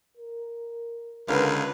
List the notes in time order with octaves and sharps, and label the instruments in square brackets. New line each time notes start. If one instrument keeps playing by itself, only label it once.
[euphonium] A#4
[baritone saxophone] C#2 [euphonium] D3 [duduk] A#4 [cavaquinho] B4 F5